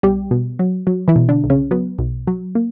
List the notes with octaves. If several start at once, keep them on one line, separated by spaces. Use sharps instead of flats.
B1 G3 G4
B2
F#3
F#3
E3 E4
B2
D3 D4
B1
C#3 C#4
F#3 B3
B1
F#3
A#3